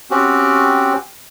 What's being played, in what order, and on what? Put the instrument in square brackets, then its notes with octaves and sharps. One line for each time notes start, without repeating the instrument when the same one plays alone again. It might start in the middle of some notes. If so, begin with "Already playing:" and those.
[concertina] C4 C#4 F#4 G4